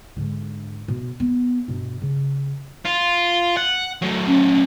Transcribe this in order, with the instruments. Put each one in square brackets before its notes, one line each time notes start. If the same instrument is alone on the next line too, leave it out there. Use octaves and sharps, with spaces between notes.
[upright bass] G#2 D3
B2
B3
G2 B2
C#3
[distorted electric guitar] F4
F#5
F#3 A3
[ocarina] C#4